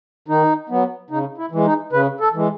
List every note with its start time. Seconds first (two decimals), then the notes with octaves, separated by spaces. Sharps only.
0.28 D#3 D#4
0.69 F#3 B3
1.10 C#3 D#4
1.38 E4
1.51 E3 G#3
1.65 D#4
1.93 C#3 B4
2.20 A4
2.34 E3 G#3